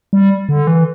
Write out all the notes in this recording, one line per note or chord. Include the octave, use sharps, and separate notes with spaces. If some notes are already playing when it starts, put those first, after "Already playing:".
G3
D3
E3